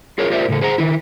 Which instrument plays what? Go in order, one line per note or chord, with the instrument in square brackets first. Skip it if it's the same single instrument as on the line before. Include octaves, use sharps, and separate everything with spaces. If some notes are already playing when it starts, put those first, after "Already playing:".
[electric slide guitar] F4 G#4 A#4 C#5
F4 G4 A#4 C5 D5 E5
A2 C#3 A4
G#4 C5 F#5 A#5
D#3 E4